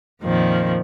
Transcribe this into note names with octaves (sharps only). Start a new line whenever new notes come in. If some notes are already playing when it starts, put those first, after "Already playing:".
F2 A#2 D#3 F3